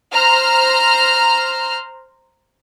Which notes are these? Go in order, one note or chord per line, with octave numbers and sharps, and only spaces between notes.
C5 A#5 F6